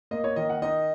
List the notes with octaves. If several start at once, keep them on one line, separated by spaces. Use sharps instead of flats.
A#3 D#5
C#5
D#3 D#5
F#5
D#4 D#5